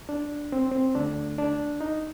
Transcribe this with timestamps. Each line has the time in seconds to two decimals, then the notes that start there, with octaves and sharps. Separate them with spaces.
0.09 D4
0.52 C4
0.71 C4
0.95 D2 D3 A3 D4
1.38 D4
1.81 D#4